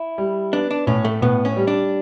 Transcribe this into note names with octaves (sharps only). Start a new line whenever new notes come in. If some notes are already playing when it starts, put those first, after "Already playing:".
Already playing: E4
G3
B3 D4
D4
A2 C#4
A3
A2 B3
C#4
G3
D4